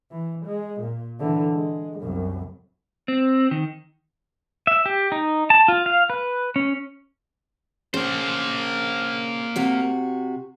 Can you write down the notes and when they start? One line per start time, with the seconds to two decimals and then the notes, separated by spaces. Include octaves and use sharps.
0.11 E3
0.46 G#3
0.81 A#2
1.19 D3 E3
1.54 G#3
1.99 C2 F#2
3.08 C4
3.51 D#3
4.67 E5
4.86 G4
5.12 D#4
5.50 A5
5.68 F4
5.86 F5
6.10 B4
6.56 C#4
7.94 C#3 A#3 C5
9.56 C3 F#4